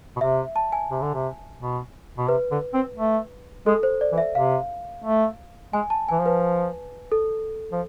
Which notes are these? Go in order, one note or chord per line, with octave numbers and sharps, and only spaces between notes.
B2
C3 E5
A5
G#5
C3
D3
C3
B2
B2
C3 B4
D3
C4
A3
G#3 A4
C5
D5
E3
E5
C3 F5
A3
G#3 G#5
A5
E3 G#5
F3
B4
A4
F3